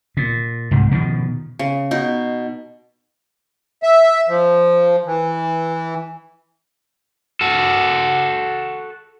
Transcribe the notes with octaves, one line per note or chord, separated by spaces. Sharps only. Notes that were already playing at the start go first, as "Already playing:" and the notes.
A#2
C2 G#2 C3
B2 D#3 F3
C#3
B2 D#4
E5
F3
E3
F#4 A4